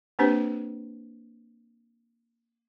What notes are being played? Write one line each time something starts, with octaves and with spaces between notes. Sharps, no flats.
A#3 C4 D4 G4 B4 C5